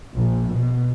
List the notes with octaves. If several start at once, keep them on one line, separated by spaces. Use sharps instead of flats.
A#1
B2